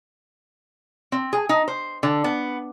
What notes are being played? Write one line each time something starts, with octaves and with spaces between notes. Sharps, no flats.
C4
G#4
D#4
C5
D3
B3